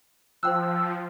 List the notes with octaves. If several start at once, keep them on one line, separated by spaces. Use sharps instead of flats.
F3 C5 G5 E6 F#6